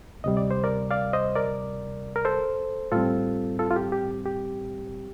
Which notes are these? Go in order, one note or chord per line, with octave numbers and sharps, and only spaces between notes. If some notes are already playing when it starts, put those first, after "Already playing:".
D2 C3 G3 D#5
D5
C5
A#4 D5
D5 F5
C5 D#5
A#4 D5
A#4
A4 C5
A2 G3 C4 F4 A4
F4 A4
F4
G4
G4
G4